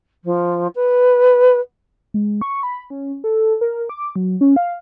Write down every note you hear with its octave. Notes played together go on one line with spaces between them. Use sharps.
F3
B4
G#3
C#6
B5
C#4
A4
A#4
D6
F#3
C#4
F5